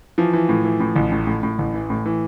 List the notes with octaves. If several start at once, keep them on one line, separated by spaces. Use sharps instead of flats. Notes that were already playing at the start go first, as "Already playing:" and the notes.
E3 F3
E3
A2
E3
A2
A1
A2
A2
A2
A1
E3
A2
E3